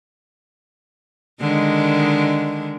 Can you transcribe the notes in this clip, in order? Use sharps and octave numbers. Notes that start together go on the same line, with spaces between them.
D3 D#3 G#3